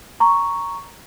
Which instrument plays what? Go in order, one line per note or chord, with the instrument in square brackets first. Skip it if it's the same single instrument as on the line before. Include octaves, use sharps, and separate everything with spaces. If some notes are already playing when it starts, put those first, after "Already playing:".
[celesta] A#5 C#6